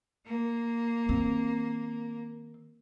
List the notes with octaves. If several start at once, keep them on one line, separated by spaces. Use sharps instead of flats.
A#3
D#3 C4